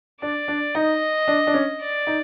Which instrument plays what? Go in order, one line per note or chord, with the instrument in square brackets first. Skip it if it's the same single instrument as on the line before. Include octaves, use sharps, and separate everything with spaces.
[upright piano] D4 [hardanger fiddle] D5
[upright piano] D4
[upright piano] D#4 [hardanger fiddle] D#5
[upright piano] D4
D4
C#4
[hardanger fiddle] D5
[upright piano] D#4